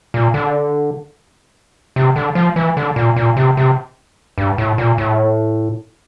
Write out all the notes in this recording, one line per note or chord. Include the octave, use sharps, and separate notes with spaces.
A#2
D3
C3
D3
F3
E3
D3
A#2
A#2
C3
C3
G2
A2
A#2
A2